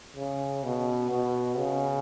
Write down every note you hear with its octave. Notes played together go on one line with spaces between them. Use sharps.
C#3
B2
B2
C#3